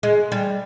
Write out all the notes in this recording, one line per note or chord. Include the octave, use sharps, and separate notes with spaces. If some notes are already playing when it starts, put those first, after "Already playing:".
G#3
G3